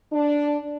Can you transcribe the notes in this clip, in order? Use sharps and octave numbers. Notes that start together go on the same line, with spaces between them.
D4